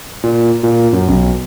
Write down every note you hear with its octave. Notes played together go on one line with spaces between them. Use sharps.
A#2
A#2
F#2
B1